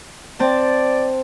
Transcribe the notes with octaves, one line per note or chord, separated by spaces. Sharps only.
C4 D5 A5